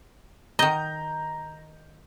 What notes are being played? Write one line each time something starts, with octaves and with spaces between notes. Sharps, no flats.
D#3 D#5 A#5 G6